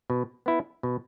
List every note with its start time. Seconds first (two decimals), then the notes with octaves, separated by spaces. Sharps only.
0.10 B2
0.46 B3 E4
0.83 B2